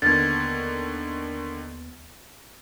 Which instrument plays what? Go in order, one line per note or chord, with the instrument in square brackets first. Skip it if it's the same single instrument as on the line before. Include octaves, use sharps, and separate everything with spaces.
[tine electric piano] D#2 B3 F6 [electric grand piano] D3 D#3 [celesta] G#6 A6